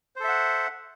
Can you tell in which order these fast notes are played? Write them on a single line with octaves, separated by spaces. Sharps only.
C5 A4 E5 F#5